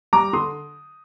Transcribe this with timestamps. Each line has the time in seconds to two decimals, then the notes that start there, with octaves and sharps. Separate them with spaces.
0.13 G3 A#5 D6
0.33 D3 C6 D#6